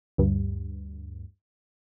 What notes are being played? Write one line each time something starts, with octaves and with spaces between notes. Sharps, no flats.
D2 G2